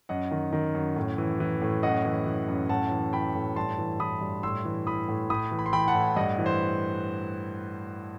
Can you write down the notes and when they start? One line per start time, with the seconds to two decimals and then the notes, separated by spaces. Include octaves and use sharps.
0.09 F#2 D#5 F#5
0.31 D#3
0.53 D#3
0.75 F#2
0.96 A2
1.18 E3
1.40 E3
1.62 A2
1.83 F#2 D#5 F#5
2.05 E3
2.26 E3
2.48 F#2
2.69 A2 F#5 A5
2.91 E3
3.13 E3 G5 B5
3.35 A2
3.56 G2 A5 C6
3.79 E3
4.00 E3 B5 D#6
4.21 G2
4.43 A2 C6 E6
4.65 E3
4.87 E3 B5 D#6
5.08 A2
5.30 A2 B5 D#6
5.51 E3
5.59 B5
5.66 C6
5.73 E3 G5 B5
5.88 F#5 A5
5.95 A2
6.16 G2 D#5 F#5
6.38 E3
6.46 C5